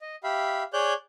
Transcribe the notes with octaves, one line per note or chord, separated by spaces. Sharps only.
D#5
G4 E5 F5 B5
G#4 C#5 D5 F#6 G6